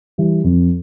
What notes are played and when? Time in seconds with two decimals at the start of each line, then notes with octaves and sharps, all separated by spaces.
0.18 E3 G3
0.44 F2